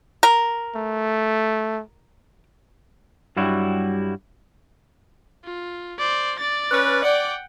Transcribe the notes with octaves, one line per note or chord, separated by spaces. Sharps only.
A#4
A3
G2 F#3 G3 E4 F#4
F4
C5 D5
D5 A6
C#4 B4
D5 F#5 G5